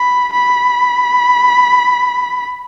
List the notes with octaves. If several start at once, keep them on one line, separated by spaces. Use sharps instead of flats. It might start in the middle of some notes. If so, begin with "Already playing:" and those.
Already playing: B5
B5